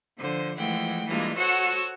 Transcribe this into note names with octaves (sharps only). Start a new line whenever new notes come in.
D3 F3 C5
E3 F3 G#3 A3 F#5 G5
E3 G3 G#3 A#3 D4 F4
F#4 A4 C5 C#5 F#5 E6